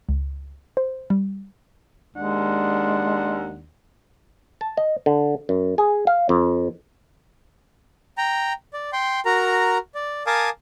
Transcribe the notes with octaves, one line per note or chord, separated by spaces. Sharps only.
C#2
C5
G3
D#2 G#3 D4 F#5
A5
D#5
D3
F#2
G#4
F5
F2
G5 A#5
D5
G5 C6
F#4 A#4 A#5
D5
A#4 F5 G#5 A5 D6 D#6